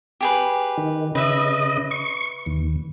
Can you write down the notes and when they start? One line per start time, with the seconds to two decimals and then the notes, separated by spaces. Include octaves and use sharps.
0.21 G4 G#4 B4
0.77 D#3
1.15 C#3 B4 D#5 E5
1.91 C#6
2.46 D#2